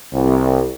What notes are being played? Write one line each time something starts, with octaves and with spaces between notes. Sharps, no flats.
C2